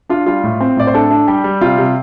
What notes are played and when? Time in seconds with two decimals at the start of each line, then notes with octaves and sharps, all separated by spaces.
0.09 D4 F4
0.26 G3 F4
0.44 A2
0.60 C4
0.77 A2 D5
0.87 C5
0.94 D4 A4
1.11 D4
1.28 G3 G4
1.44 G3
1.61 C3 F4
1.78 C3